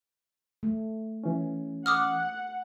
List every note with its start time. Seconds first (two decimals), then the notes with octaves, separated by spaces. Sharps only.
0.63 A3
1.24 E3 C#4
1.86 F#5 D6 D#6 F6